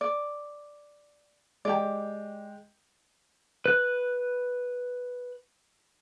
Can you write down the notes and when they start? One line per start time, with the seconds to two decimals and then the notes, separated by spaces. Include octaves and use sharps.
0.01 D5
1.65 G#3 G4 D5 G5
3.66 B4 F#6